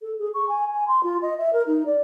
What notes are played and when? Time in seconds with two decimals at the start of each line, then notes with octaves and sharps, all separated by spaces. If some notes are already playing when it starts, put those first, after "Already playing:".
0.02 A4
0.19 G#4
0.34 C#6
0.49 G#5
0.73 G#5
0.88 C6
1.03 F4
1.22 D#5
1.38 E5
1.53 A#4
1.67 D#4
1.86 D5